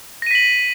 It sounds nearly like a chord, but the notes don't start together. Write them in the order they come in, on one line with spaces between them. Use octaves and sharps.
A#6 D#7 B6 F#7